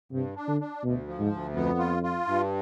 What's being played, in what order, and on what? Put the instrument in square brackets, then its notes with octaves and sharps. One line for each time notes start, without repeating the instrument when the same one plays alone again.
[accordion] G2 [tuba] C3
[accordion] D4
[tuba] D3
[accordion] D4
[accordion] D2 [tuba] B2
[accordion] F3
[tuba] G#2
[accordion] D2
[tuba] F2 [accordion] B3
[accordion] F4
F4
G2